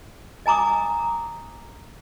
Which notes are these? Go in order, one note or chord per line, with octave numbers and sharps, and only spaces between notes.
D#5 G#5 A#5 D6 D#6